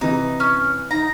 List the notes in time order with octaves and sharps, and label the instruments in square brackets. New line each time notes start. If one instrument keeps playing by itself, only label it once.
[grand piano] C3 E3 [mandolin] D#4
[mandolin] C#4
[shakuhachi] D#4 [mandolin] A#5